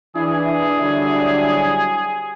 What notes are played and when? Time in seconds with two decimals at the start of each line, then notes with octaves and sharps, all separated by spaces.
0.16 E3 D4 E4 G#4
0.80 D3 F#3 G3